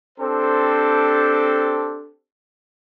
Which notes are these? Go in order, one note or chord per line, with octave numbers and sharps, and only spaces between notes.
C4 D4 G4 A4 C5